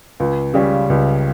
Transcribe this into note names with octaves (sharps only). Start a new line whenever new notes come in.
C#2
C#3 G3 C#4
C#2